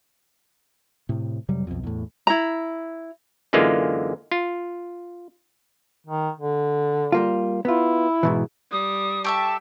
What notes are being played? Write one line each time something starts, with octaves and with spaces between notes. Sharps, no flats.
A2 C3
F2 C3 F#3 G3
B1 F2
E2 A2
E4 A#5
F#2 D3 E3 G#3 A#3 F4
F4
D#3
D3
G3 A#3 F4
B3 E4 F4
G#2 B2 E3
G3 D#6
G4 A4 E5 A5 C#6